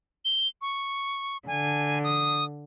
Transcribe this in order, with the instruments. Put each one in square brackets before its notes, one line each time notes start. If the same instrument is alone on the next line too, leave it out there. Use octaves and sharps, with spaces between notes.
[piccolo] G7
C#6
[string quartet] D3 [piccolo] G#5
[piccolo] D#6